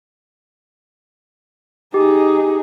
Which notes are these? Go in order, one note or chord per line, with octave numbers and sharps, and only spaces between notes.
D#4 G4 G#4